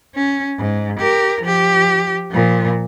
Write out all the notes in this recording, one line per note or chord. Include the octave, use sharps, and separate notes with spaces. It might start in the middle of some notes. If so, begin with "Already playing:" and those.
C#4
G#2
G4 A#4
F3 G4
A#2 F3